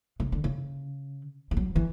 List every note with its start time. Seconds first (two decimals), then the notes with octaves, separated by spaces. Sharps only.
0.20 C#3
0.32 D3
0.44 C#3
1.51 G#3
1.57 F#3
1.76 E3